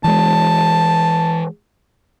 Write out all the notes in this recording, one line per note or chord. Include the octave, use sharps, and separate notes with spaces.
E3 G#3 A5